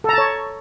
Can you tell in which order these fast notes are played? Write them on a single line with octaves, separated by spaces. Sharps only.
A4 A#5 A5 C#5